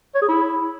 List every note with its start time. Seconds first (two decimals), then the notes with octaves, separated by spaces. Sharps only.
0.15 C#5
0.22 G#4
0.29 E4